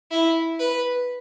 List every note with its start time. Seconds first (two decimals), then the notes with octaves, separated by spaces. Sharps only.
0.11 E4
0.60 B4